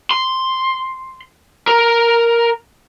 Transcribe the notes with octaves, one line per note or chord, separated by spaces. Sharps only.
C6
A#4